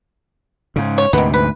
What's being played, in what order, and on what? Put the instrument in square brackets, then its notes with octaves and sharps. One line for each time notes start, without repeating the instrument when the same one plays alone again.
[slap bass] G#2 C#3
[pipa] C#5
[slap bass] D2 G#2 C3 [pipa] D#3 B3
[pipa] B4